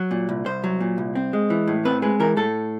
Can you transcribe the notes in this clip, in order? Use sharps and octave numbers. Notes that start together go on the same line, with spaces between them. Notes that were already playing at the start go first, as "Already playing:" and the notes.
Already playing: F#3
A#2
C2
C2 C5
F#3
A#2
C2
C4
G#3
E3
A2
C4 B4
G#3 B4
E3 A#4
A2 A4